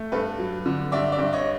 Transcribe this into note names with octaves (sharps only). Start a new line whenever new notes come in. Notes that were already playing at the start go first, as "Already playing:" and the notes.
Already playing: A3
G2 A4 B4
F#3
D3
G2 D5 E5
D5 E5
G2
C#5 D#5